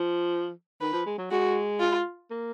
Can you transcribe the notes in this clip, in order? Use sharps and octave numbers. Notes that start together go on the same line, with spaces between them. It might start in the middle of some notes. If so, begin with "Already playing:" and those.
Already playing: F3
D#3 B4
F3
G#3
F#3
G#3 F#4
F4
A#3